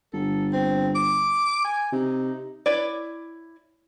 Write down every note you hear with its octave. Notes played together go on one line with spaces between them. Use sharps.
G1 A4
C4
D6
G#5
C3 D#4
E4 B4 C#5 D5